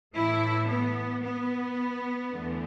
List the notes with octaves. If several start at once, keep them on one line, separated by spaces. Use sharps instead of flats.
A2 E3 A3 E4
B3
B3
E2 D3 A3